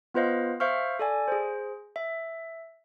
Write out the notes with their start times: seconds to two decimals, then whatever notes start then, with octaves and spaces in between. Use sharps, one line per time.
0.14 B3 F4 B4 C5 D#5 F5
0.60 C5 E5 F5 C#6 F6
0.99 A4 D5 G#5
1.28 G#4 C5
1.96 E5